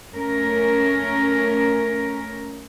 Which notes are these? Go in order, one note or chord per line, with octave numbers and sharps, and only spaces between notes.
A3 C#4 A#4